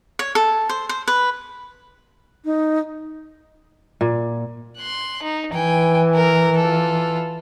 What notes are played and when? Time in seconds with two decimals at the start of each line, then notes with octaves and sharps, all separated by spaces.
0.19 C#5
0.35 A4
0.69 C5
0.89 C5
1.08 B4
2.45 D#4
4.01 A#2
4.77 C6 F#6
5.23 D#4
5.54 E3 G5 G#5
6.14 A#4
6.58 F4 A4